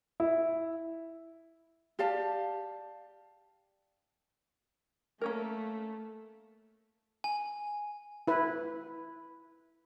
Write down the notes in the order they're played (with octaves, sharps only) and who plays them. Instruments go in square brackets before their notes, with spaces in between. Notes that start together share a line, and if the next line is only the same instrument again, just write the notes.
[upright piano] E4
[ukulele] G4 D5 F5 A5
[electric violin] A3 [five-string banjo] A#3 C#4 A#4
[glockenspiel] G#5
[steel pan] E4 B4